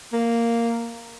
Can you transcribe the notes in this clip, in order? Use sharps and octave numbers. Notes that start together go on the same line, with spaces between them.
A#3